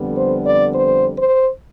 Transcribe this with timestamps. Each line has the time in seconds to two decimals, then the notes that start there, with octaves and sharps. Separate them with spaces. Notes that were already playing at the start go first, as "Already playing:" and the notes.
Already playing: F2 D3 G3 B3
0.16 C5
0.46 D5
0.75 C5
1.19 C5